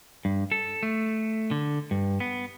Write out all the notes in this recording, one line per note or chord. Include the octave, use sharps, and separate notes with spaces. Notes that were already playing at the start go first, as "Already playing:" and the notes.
G2
A4
A3
D3
G2
B3